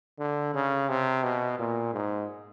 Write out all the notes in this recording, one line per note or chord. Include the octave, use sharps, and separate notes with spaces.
D3
C#3
C3
B2
A#2
G#2